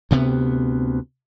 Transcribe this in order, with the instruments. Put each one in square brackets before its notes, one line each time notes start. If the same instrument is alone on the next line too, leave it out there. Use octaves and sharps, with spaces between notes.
[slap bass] D2 C3 B3